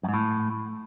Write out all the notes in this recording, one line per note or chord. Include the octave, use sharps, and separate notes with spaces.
F#2
G#2
A2